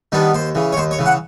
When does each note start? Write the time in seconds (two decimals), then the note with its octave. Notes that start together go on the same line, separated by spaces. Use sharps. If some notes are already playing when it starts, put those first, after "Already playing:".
0.12 D#3 G3 B3 D4
0.34 D#2 C5
0.55 C#3 E3
0.73 C#5
0.77 D#2 C5
0.91 C#5
0.99 C#3 E3
1.06 F#5